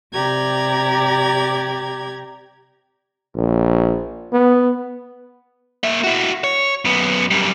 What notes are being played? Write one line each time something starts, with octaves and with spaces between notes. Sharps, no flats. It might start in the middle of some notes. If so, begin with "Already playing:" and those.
C3 G4 D5 A#5 G#6
A#1
B3
A#3 E5
E4 F#4
C#5
F#2 B3
F#2 G3